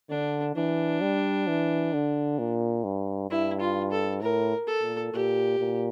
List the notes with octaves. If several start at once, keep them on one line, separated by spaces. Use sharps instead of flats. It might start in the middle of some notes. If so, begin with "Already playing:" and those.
D3 D4
E3 D4
G3
E3
D3
A#2
G2
G2 E4
F4
A4
A2 A#4
A4
A#2
A#2 G4
A#2